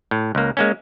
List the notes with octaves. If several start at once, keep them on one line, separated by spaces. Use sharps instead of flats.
A2
C#2 A#3
G#3 A#3 C#4